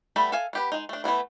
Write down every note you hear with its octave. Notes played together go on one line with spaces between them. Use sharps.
G3 A3 B3 A4 B5
A4 E5 F5 G#5
B3 G4 B4
G#3 D#4
A3 D4
E3 A3 B3 E4